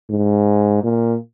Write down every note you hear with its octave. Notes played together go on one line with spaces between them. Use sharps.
G#2
A#2